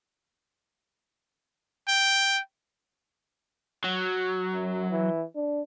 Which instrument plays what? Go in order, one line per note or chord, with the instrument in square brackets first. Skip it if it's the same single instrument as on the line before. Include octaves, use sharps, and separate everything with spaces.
[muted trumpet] G5
[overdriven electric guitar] F#3
[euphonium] F#2
E3
D4